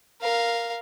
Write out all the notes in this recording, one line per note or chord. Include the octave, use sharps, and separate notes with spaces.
A#4 F5